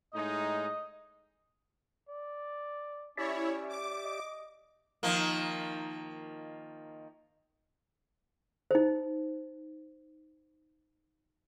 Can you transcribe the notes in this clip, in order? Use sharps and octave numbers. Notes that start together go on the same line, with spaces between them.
A2 G#3 D#4 D#5
D5
C#4 E4 G4 C#5 D5 E5
D6
D#5
D#3 F3 A#3
D#4 C5